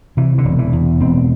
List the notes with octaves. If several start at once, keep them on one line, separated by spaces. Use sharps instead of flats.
C3 E3
D3
E1
E3
E2
E1 C4